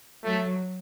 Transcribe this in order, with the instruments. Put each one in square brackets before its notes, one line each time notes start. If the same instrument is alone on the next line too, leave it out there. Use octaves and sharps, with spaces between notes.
[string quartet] F#3 [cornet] A3